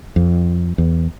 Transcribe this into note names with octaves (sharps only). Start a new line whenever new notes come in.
F2
E2